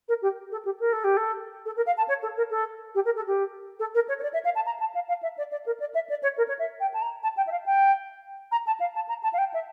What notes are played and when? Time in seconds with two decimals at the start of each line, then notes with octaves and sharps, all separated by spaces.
0.08 A#4
0.22 G4
0.51 A4
0.65 G4
0.79 A#4
0.92 A4
1.04 G4
1.17 A4
1.65 A4
1.76 A#4
1.86 F5
1.97 A5
2.08 C#5
2.22 A4
2.37 A#4
2.50 A4
2.94 G4
3.05 A#4
3.16 A4
3.27 G4
3.79 A4
3.94 A#4
4.08 C#5
4.19 C#5
4.22 D5
4.33 E5
4.44 F5
4.55 A5
4.66 A#5
4.80 A5
4.94 F5
5.08 F5
5.22 E5
5.37 D5
5.51 D5
5.66 A#4
5.80 D5
5.94 E5
6.09 D5
6.22 C#5
6.37 A#4
6.48 C#5
6.59 E5
6.80 G5
6.93 A5
7.01 A#5
7.23 A5
7.37 G5
7.47 E5
7.51 F5
7.66 G5
8.51 A#5
8.66 A5
8.80 F5
8.95 A5
9.08 A#5
9.23 A5
9.33 F5
9.38 G5
9.53 E5